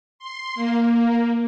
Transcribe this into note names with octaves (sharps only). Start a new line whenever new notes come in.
C6
A#3